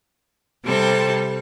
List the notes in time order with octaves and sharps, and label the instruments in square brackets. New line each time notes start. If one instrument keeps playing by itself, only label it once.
[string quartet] C3 G3 C4 A4